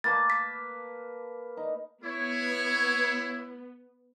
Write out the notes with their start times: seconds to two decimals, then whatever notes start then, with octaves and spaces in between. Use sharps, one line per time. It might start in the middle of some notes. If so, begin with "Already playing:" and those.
0.04 A#3 B4 A5 A6
0.30 B6
1.57 D#4
2.04 B3 E4 C#5